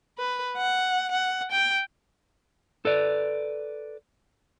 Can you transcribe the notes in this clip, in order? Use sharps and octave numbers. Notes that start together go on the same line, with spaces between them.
B4
F#5
F#5
G5
A4 B4 D5